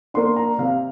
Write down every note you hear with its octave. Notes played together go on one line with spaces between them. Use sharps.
A#3 D4 C6
A#5
C3 F5